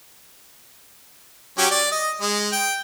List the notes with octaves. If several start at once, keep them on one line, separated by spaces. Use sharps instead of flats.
F#3 C#4 G4
D5
D#5
G#3
G5